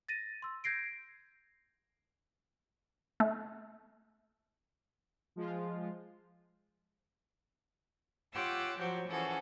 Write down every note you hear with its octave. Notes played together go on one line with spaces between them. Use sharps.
A6 A#6 D#7
C6 E6
G6 G#6 A#6 C7 D7
A3
F3 G#3 F4
F4 G4 C#5 F#5 D6 E6
F3 F#3 F#4 G4 C5 C#5
E3 F3 C#4 F#4 G#4 A4